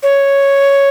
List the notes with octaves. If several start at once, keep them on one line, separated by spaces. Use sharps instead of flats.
C#5